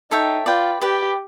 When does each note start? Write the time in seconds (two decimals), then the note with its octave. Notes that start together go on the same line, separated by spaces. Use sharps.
0.11 D#4 A4 C#5 E5 G5
0.46 F4 B4 D5 G5
0.81 G4 B4 D5 G5